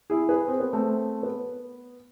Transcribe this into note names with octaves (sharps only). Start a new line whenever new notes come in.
E4 G#4
G#4 B4
C4
B3
A3 C4
B3